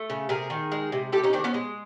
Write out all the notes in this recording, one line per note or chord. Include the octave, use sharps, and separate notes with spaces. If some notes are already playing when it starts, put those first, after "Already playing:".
Already playing: A3
C#3
C3 G#4 A#4
D#3
G#3
C3
C3 G4 A4
C#4 D#4
D#3 C4 D4
B3 C#4
G#3